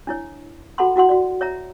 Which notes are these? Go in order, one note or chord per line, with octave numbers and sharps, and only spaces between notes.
D4 E4 C#5
F#4 A4 F#5 A5 B5 C6
E4 F#4 F#5 C6
F#4 D5
C#5 E5 A#5